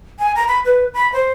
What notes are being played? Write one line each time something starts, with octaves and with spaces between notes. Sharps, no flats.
G#5
A#5
B5
B4
B5
C5